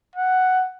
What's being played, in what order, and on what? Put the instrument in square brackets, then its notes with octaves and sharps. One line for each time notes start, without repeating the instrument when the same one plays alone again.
[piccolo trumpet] F#5